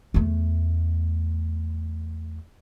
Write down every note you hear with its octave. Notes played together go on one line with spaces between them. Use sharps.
E2 A3